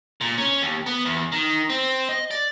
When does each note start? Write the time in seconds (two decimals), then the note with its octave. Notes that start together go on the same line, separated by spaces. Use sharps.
0.21 A#2
0.38 C#4
0.62 D#2
0.86 B3
1.05 E2
1.32 D#3
1.70 C4
2.09 D#5
2.31 D5